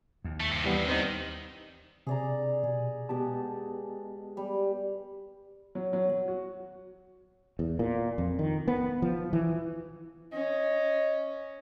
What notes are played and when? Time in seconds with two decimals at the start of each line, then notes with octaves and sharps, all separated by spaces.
0.24 D#2
0.40 A3
0.52 G2 C3
0.64 E3 G3 B3
0.88 D#3 C4 D#4
2.07 C3 G#4 D5 A#5
2.63 B2 G#4
3.09 B2 G#3 B3 G4 A5
4.37 G3
5.75 F#3
5.93 F#3
6.10 F#3
6.28 F#4
7.59 E2
7.79 A#2
8.18 F2
8.39 D#3
8.68 B3
9.02 F3
9.33 E3
10.32 C#4 D#5